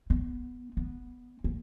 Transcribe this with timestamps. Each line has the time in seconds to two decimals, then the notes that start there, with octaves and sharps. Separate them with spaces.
0.10 B3
0.77 B3
1.44 A#3